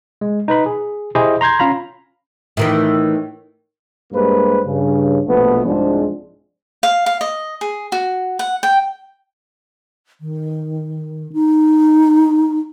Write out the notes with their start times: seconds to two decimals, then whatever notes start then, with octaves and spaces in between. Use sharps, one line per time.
0.21 G#3
0.48 D#4 B4 B5
0.66 G#4
1.15 E4 G4 G#4 C5 D#5
1.41 A#5 C6 G6 G#6
1.59 C#4 F4 F5 A#5 B5
2.57 A2 D#3 E3
4.12 G2 G3 G#3 A#3 B4 C5
4.65 G2 C#3
5.27 A#1 B2 F3 A3 B3
5.65 C2 G#2 F3 G#3 C4 D4
6.83 F5
7.06 F5
7.21 D#5
7.61 G#4
7.92 F#4
8.39 F#5
8.63 G5
10.21 D#3
11.33 D#4